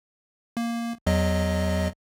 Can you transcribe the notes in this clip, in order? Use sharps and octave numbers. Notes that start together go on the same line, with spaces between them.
A#3
E2 F#3 D#5